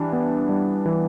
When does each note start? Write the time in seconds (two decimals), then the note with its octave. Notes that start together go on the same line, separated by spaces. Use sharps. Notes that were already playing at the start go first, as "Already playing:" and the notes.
Already playing: E3 G3 D4
0.13 B3
0.49 G3
0.86 E3